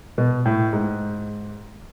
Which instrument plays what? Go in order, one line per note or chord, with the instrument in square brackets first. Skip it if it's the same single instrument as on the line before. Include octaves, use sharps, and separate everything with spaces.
[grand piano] B2
A2
G#2